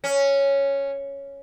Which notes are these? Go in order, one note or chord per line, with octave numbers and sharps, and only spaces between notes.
C#4